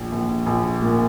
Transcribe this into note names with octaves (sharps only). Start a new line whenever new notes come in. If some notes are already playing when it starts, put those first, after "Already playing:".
Already playing: A#1
A#1
A#1
A#2